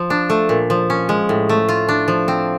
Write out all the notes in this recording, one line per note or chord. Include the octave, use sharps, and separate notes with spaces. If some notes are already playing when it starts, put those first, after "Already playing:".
Already playing: F3
D4
A3
A#2
F3
C#4
G#3
A2
A3
F4
D4
F3
C4